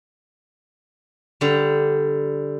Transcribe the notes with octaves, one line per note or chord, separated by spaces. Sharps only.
D3 G3